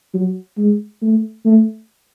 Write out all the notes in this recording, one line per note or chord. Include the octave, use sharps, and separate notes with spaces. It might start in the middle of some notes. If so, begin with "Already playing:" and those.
F#3
G#3
A3
A3